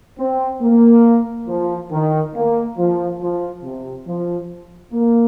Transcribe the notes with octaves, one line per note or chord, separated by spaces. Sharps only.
C4
A#3
F3
D#3
A#3
F3
F3
C3
F3
A#3